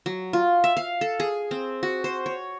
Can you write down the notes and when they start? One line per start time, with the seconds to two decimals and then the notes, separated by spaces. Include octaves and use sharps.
0.06 F#3
0.33 F4
0.64 E5
0.77 F5
1.01 A4
1.20 G#4
1.51 C4
1.83 F#4
2.04 C5
2.26 C#5